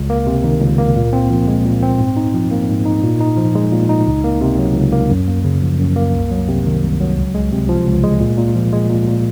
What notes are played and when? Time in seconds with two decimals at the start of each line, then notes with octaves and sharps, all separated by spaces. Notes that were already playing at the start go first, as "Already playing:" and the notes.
Already playing: C#2
0.10 A#3
0.27 C3
0.44 D#3
0.61 C#2
0.78 A#3
0.96 A#2
1.13 C4
1.30 F3
1.48 G#3
1.65 A#2
1.82 C4
1.99 G#2
2.16 D#4
2.34 F3
2.51 A#3
2.68 G#2
2.86 D#4
3.03 A#2
3.21 D#4
3.37 F3
3.55 G#3
3.72 A#2
3.89 D#4
4.07 C#2
4.24 A#3
4.41 C3
4.58 F#3
4.75 C#2
4.92 A#3
5.11 F#2
5.28 A#3
5.44 C#3
5.62 F3
5.79 F#2
5.96 A#3
6.14 C2
6.31 F#3
6.48 C3
6.66 D#3
6.83 C2
7.00 F#3
7.18 C#2
7.35 G#3
7.52 C3
7.69 F3
7.87 C#2
8.04 G#3
8.20 A#2
8.38 A#2
8.55 F3
8.73 G#3
8.90 A#2
9.08 A#2